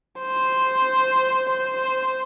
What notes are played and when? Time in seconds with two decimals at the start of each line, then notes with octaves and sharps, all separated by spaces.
0.20 C5
1.50 C5